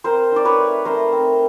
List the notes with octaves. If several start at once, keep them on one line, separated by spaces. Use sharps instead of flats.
C4 A#4 C5
D#4 D5
B4 C#5
A3
A3 A#4 C5
C4